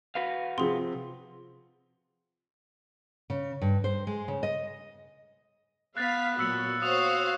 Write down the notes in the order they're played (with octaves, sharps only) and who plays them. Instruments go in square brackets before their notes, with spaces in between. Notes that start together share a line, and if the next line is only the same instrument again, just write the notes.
[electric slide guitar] F#4 B4 F5
[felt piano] C3 F3 [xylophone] G#4 C6
[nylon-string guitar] C#3
G2
C5
G#3
C#3
D#5
[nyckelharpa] B3 [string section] F5 B6 [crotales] F#6 A6
[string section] A#2 F#3 [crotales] E6 C#7 F#7
[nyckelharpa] F#4 [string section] C5 C#5 F5 [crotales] D#6 F7